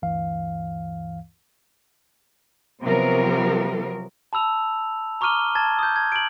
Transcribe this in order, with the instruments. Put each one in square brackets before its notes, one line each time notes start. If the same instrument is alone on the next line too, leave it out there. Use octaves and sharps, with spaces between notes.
[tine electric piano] D2 G2 E3 F5
[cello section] C3 F3 F#3 B3 A#4
[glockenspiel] A5 B5 E6 F7
A#5 C#6 D6 F6 D#7 G7
A5 G#6 A6
D#6 G6
G#6
D7 F#7